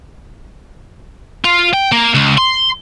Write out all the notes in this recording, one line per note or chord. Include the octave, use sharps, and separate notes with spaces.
F4
G5
A#3
C#2
C6